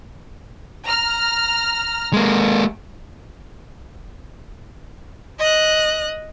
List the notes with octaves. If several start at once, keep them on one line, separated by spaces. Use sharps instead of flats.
A#5 F6
G#3 A#3
D#5 F#6